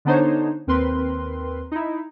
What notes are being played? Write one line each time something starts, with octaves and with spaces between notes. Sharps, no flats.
D3 B3 D4 D#4 C5 C#5
D#2 C4 A#4 B4 C6
D#4 E4